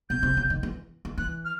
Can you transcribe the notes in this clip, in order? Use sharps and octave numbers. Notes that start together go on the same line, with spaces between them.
B2 G6
C3
C#3
D#3
E3
D#3
E3 F#6
F6